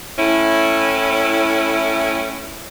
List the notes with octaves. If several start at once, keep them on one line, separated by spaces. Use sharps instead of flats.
A2 C#4 E4